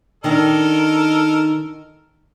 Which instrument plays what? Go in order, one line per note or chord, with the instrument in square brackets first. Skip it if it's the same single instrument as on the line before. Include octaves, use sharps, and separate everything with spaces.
[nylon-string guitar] D#3 D4 [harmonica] A4 A#4 D#5